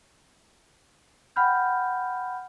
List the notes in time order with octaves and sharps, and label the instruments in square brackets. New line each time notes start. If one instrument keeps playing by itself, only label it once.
[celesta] F#5 G5 B5 F6 G6